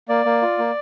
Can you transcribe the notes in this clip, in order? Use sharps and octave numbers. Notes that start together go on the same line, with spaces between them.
A#3 D5
A#3
F4
A#3